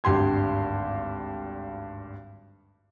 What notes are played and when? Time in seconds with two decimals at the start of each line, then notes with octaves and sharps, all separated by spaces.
0.04 G#1 D2 G2 G4 C6 G#6